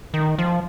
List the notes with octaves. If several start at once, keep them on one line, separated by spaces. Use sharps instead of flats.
D#3
F3